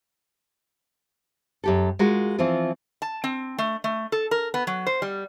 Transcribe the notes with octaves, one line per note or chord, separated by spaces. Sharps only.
F#2 G4 A4
G#3 F4 F#4 A#4
E3 F3 C4 F4
A5
C4
A3
A3
A4
A#4
B3
F#3
C5
G3